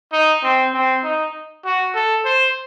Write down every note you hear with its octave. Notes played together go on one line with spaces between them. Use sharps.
D#4
C4
C4
D#4
F#4
A4
C5